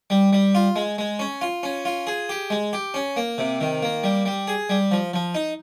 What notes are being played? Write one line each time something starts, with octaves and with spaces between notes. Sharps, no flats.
G3
G3
F4
G#3
G#3
C#4
F4
C#4
F4
G#4
G4
G#3
G4
C#4
A#3
C3
D#3
A#3
G3
G3
G#4
G3
F3
F3
D#4